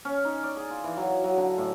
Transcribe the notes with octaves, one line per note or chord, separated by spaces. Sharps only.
C#4
D#4
D5
G#4
F4
E3
F#3
F#3
D3
A2